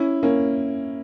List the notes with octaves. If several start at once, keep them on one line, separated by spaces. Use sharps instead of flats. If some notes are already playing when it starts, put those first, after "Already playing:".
Already playing: C#4 E4
A#3 C#4